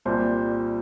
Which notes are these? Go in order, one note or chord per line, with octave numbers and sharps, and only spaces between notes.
C2 A#2 G3 C5